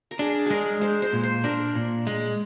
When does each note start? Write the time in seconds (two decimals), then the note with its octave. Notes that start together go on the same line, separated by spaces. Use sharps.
0.11 A#4
0.19 D4 G#4
0.46 G#3 G#4 A#4
0.81 G#3 C5
1.02 C5
1.13 A#2
1.23 C5
1.44 D4 A#4
1.75 A#2
2.07 G#3